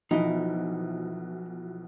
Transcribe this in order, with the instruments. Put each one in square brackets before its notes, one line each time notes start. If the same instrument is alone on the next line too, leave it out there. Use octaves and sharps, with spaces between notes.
[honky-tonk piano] B1 B2 E3 [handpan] F3 [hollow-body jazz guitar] D#4 E4 D#5